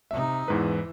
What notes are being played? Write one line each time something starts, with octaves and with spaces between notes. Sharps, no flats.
C3 D#4 E5
E2 G#2 E3 B4